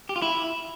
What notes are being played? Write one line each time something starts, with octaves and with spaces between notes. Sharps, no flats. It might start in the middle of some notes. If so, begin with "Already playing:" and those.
G4
F4
E4